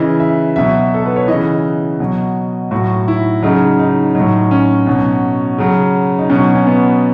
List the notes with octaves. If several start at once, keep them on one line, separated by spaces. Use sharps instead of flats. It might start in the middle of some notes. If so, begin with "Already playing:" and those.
Already playing: C#3 E3 D#5
E5
B2 F#3 E5
A4
B4
C#5
C#3 E3 D#5
B2 F#3
A2 F#3 F#4
E4
C#3 F#3 D#4
D#4
F#3 D#4
A2
C#4
B2 F#3
C#3 F#3
D#4
B2 F#3 C#4
C#4
B3